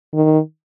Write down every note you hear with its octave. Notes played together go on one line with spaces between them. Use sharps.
D#3